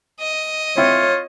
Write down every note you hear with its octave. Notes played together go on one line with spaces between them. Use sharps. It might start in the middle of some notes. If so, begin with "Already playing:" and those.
D#5
C4 E4 F4 C#5